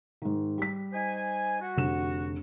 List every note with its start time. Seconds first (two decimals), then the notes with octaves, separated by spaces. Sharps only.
0.22 G#2 D#3
0.58 G3 B6
0.93 D#4 C5 G#5
1.61 F#4
1.76 F1 D3 E7